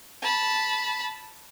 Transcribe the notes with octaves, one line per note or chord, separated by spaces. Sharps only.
A5 B5